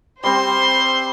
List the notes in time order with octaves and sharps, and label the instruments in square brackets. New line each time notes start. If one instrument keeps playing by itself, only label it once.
[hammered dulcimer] G3 C4 [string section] C5 [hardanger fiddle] C6